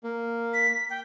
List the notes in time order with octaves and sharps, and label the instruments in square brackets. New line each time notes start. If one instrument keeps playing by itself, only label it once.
[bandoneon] A#3
[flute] B6
G5